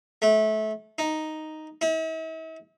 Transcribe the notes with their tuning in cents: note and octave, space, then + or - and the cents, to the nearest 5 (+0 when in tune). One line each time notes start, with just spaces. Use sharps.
A3 -25
D#4 +0
E4 -45